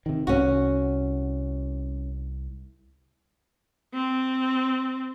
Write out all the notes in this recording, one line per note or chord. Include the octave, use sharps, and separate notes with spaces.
C3 D#3
C2 C#4 F#4
C4